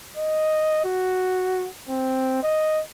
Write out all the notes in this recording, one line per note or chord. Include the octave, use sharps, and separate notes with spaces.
D#5
F#4
C4
D#5